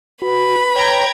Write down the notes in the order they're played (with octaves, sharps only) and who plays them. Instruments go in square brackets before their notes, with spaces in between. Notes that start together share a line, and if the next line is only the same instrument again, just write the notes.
[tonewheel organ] F#4 [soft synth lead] B4 [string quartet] B5
[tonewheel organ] C#5 [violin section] G5 A#5 G#6